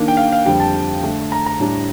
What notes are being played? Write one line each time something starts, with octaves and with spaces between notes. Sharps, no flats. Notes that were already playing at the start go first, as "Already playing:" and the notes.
Already playing: D#3 A#3 D4
G5
F5
F5
F2 D3 G3 G5
A5
D3 A3 D4
A#5
A#5
A2 G3 D4